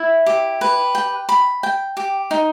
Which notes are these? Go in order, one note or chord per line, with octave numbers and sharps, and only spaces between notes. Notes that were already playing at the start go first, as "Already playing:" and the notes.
Already playing: E4 E5
G4
B4
G5
B5
G5
G4
D#4